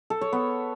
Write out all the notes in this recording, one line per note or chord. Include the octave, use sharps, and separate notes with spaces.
A4
C#5
B3